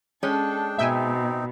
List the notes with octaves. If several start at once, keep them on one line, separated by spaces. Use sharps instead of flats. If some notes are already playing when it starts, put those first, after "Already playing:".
G#3 C#4 D4 A4 G5
B2 C4 D#4 E5 G5 G#5